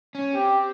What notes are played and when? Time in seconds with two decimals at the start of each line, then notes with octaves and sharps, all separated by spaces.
0.15 C#4
0.35 C4 G4